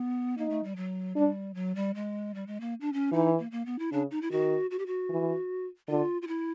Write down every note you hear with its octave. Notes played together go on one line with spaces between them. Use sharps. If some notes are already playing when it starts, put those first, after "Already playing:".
Already playing: B3
A#3 D#4
A3
G3
F#3
G3 D4
F#3
G3
G#3
G3
G#3
A#3
D4
C#4
E3 D#4
A#3
A#3
B3
E4
C#3 D4
D#4
E4
D#3 F#4
F#4
G4
F#4
E3
D3 F4
F4
E4